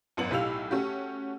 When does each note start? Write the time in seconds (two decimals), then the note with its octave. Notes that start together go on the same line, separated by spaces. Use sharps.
0.17 G#1 F#2 B3 F#7
0.31 B1 A2 G4 F5 E6 F7
0.71 A3 C#4 F#4 G4